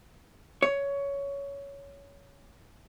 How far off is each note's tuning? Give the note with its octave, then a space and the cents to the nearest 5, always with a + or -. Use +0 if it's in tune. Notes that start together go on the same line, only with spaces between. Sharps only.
C#5 +15